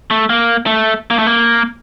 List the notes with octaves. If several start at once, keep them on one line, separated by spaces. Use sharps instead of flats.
A3
A#3
A3
A#3
A3
A#3